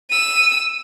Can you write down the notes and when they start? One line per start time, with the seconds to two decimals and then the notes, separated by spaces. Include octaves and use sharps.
0.11 E6 D#7